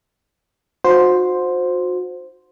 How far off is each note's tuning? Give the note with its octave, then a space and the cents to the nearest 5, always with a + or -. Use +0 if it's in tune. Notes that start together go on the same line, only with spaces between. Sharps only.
D#4 +0 F#4 -35 C5 +0